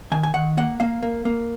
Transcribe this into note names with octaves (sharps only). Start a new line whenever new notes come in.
D#3 G#5
G#5
D#3 F#5
A#3 F#5
A#3 F5
A#3
A#3